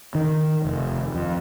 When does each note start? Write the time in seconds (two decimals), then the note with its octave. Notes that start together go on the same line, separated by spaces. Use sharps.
0.15 D#3
0.64 F1
1.15 F2